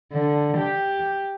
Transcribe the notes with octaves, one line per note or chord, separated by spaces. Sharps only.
D3
G4